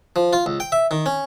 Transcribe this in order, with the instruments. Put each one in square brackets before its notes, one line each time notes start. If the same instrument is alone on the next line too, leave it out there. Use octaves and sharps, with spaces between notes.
[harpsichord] F3
F4
C#2
G5
E5
D#3
C#4